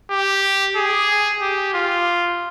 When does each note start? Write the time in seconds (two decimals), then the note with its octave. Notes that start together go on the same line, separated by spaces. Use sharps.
0.11 G4
0.76 G#4
1.41 G4
1.74 F4